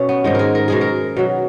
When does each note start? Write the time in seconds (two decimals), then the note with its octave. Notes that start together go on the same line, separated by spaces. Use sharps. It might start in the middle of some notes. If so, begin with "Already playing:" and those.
Already playing: B2 C#4
0.09 B3
0.24 G#2 D#3 G#3
0.35 G#4 A#4
0.55 A#4
0.68 B2 G#3 G#4
0.81 A#4
1.17 B2 F#3